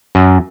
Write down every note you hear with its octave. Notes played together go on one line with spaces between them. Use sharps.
F#2